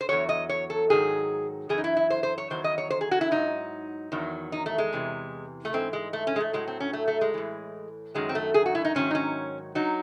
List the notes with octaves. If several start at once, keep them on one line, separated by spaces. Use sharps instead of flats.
C5
E2 C#3 F#3 C#5
D#5
C#5
A4
G#2 D#3 F#3 G#4
F#2 E3 G#4
D#4
E4
E4
C5
C5
C#5
E2 D#3 F#3 C5
D#5
C#5
C5
G#4
F#4
E4
G#2 F#3 D#4
E2 D#3 F#3
D#4
A3
G#3
E2 C3 E3
A3
G#2 E3 C4
G#3
A3
C#4
G#3
A3
A2 F#3 G#3
C4
C#4
A3
A3
G#3
A2 E3
F#2 D#3 F#3 G#3
C4
A3
G#4
F#4
E4
D#4
G#2 D#3 F#3 C#4
D#4
C#4
F#3 D#4